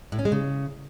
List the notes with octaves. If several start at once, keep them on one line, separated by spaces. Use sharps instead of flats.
A2
C#4
G#3
C#3